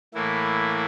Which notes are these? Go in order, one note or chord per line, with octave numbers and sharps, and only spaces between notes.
A2 E3 A#3 E4